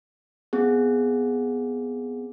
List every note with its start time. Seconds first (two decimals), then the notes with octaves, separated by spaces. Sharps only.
0.53 B3 C4 G#4